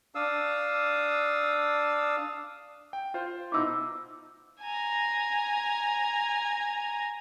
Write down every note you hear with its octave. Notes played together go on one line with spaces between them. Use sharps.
D4 F5 D#6 E6
G5
F4 C5
B2 D#4 E4 D6 E6
G#5 A#5